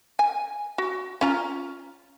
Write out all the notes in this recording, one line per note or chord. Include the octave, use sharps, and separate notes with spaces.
G#5
F#4
C#4 F4 A#5